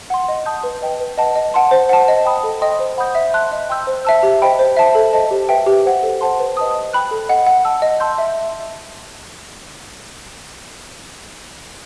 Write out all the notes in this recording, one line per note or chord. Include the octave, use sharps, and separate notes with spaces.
F#5 C6
D#5
A5 D#6 G6
B4
D#5 G5
B4
D#5 F#5 A5
D#5
F#5 A5 C6
C5
F#5 A5
D#5
G5 B5 D#6
A4
D#5 G5 C6 D#6
C5
F#5 B5 D#6 G6
E5
A5 C6 F#6
D#5
G5 C6 E6 G6
C5
E5 A5 E6
G4
C5 D#5 G5 B5
C5
E5 A5
A4
C5 D#5 A5
G4
B4 E5 G5
G4
C5 F#5
A4
C5 F#5 A5 C6
B4
D#5 A5 D#6
D#5
G5 B5 F#6
A4
D#5 F#5
F#5
A5 E6
D#5
A5 C6 E6 G6
E5